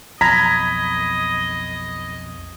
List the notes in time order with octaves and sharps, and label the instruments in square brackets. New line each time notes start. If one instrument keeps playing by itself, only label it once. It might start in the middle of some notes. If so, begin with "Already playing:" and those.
[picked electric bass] B1 F2 [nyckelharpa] D#5 [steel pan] A#5 [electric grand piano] B5 G#6 B6